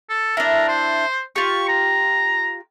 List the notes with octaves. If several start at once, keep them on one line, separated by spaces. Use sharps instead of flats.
A4
D4 E4 A#4
C5
F4 G4 C#6
A#5